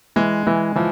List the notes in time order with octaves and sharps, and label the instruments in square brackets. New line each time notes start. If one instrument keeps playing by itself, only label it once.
[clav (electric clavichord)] E3 [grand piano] G#3
[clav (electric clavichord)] E3 [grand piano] G#3
[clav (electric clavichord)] E3 [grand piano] F3